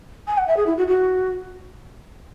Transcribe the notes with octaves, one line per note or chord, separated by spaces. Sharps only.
G#5
F#5
E5
G#4
E4
F#4
F#4